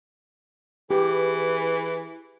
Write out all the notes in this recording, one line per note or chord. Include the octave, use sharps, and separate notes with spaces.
E3 G4 G#4 B4